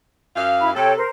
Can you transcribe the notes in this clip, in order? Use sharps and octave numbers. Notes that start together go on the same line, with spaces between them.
F#2 F5
E4 B5
C3 A4 C#5 G5
A#4 C5